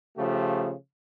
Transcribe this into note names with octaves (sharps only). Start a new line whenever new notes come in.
C#3 F3 A3 F4 G4